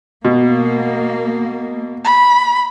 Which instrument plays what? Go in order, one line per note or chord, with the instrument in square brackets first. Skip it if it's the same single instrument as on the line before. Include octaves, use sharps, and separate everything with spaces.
[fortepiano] B2 [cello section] A#3
[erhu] B5